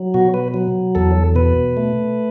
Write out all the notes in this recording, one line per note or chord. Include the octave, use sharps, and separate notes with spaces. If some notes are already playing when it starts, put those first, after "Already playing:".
Already playing: F#3
B2 F#4
B4
F#3
E2 A4
B2 B4
A3